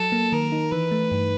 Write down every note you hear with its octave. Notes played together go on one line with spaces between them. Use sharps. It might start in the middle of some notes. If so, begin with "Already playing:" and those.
Already playing: F#3 A4
A#3
D#3 A#4
D#4
E3 B4
A3
G2